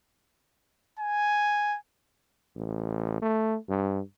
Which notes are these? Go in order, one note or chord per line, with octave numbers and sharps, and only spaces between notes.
G#5
A1
A3
G2